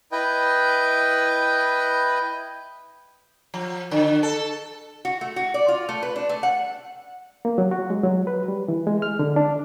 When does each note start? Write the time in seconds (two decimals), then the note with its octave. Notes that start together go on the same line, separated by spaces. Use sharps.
0.12 E4 B4 D#5 G5
3.54 F3
3.91 D3
4.23 A4
5.05 F#4
5.21 A3
5.36 F#4
5.54 D5
5.68 F4
5.89 A3
6.03 B4
6.16 D4
6.29 A3
6.43 F#5
7.45 A#3
7.58 F#3
7.71 F#4
7.90 G#3
8.04 F#3
8.27 B4
8.48 G3
8.68 E3
8.87 G#3
9.02 F6
9.19 D3
9.36 D4